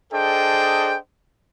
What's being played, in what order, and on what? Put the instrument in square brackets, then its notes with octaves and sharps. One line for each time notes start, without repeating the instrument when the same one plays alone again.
[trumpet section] D4 G#4 A4 C5 D#5 G5